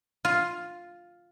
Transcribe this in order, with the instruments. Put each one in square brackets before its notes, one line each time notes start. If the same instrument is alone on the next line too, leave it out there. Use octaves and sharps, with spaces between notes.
[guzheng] F4